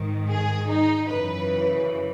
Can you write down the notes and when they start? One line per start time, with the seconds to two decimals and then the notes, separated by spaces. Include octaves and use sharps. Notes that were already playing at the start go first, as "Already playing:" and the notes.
Already playing: G#2 D#3
0.29 G#4
0.69 D#4
1.09 F#2 C#3 E3 B4